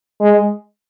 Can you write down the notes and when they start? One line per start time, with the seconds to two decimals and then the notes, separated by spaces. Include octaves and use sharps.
0.21 G#3